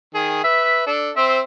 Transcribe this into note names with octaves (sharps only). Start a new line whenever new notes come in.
D#3 G#4
B4 E5
D4 A4
C4 C5 E5